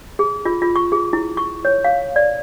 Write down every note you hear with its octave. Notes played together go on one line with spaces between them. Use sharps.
G#4
F4
F4
C#6
G#4
E4
C#6
C#5
F5
D5